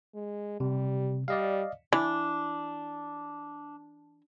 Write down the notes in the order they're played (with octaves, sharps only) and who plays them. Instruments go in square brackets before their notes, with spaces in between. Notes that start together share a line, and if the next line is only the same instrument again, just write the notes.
[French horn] G#3
[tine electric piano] C3 [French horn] G3
[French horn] G3 [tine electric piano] D5 D#5 F5
[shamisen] E3 [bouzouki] D4